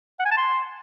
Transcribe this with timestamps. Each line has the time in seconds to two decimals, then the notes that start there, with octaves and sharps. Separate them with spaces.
0.19 F#5
0.25 G#5
0.31 A5
0.37 C6